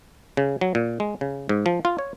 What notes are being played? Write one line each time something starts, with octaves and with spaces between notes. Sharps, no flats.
C#3
F#3
A#2
G#3
C#3
G#2
F3
F4
C#5